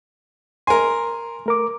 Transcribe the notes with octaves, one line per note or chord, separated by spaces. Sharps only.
A#4 G#5 C6
A3 A#4 D6